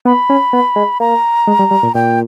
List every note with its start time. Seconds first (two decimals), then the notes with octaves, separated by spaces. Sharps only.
0.05 B3 B5
0.30 C#4
0.53 B3
0.76 G#3
1.00 A#3 A#5
1.47 G#3
1.59 G3
1.71 G3
1.83 A#2
1.95 A#2 G5